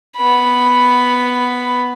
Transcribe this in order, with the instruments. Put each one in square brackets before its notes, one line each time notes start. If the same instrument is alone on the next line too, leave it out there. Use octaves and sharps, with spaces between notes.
[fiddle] B3 B5